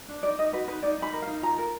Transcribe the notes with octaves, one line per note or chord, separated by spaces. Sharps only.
D4
D#4 D5
D#4 D#5
F#4 B4
D#4 B4
D#4 D5
D#4 B5
A#4
F5
D#4
F4 A#5
A#4